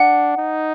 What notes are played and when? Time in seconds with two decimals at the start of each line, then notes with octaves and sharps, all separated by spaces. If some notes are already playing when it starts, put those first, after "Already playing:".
Already playing: D4 F#5
0.37 D#4